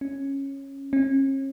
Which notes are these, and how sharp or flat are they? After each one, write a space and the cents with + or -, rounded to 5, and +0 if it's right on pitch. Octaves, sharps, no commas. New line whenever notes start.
C#4 -10
C#4 -40